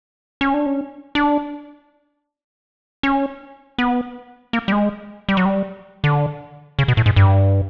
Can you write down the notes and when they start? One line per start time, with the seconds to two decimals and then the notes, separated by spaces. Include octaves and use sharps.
0.41 C#4
0.54 D4
0.66 C#4
1.15 D4
3.03 C#4
3.78 B3
4.53 A#3
4.68 G3
4.72 G#3
5.29 G3
5.37 F#3
5.45 G3
6.04 D3
6.79 C#3
6.88 B2
6.97 A2
7.06 G#2
7.16 G2